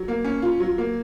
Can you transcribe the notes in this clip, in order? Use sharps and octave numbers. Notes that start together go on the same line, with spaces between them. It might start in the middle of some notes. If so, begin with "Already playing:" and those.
Already playing: F#3
A#3
C#4
F4
F#3
A#3